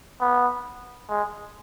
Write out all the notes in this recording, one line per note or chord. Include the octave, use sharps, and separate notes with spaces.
B3
G#3